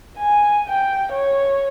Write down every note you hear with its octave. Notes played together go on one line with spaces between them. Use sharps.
G#5
G5
C#5